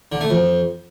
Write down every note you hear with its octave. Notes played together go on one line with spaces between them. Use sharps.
D3
A3
F2